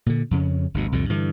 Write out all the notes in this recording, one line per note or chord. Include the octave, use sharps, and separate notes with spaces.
A#2 D3
F2 C#3 C#4
G1 D2 B2
C2 F2 A#2 D3
G2 D3 E3